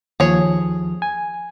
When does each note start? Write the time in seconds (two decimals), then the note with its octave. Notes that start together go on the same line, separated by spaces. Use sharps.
0.20 D#2 F3 G#4 C#5
1.02 G#5